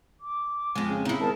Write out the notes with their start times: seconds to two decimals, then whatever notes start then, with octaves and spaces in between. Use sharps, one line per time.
0.20 D6
0.75 F2 G#3
0.89 C#3
1.05 D#4 E4
1.20 G#1 G#4 A#4 A5